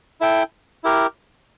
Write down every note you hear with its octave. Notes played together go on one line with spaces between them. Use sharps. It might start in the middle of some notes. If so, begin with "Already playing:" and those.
E4 A4 E5 G5
E4 G4 A#4